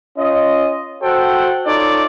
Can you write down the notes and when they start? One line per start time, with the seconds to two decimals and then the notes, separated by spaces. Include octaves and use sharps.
0.18 C#4 F4 D#5
1.03 F#4 A4 C5 F#5 G5
1.66 D#4 F4 A4 C#5 D5